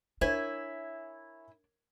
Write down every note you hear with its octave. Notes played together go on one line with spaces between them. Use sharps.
D4 E4 A#4 C#5 E5 G#5